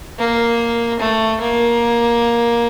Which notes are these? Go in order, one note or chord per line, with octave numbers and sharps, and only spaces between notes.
A#3
A3
A#3